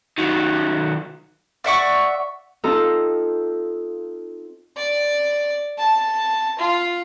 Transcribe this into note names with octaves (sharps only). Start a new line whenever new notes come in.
D#3 F#3
D5 E5 F#5 C#6
C4 D#4 F4 A4 A#5
D5
A5
F4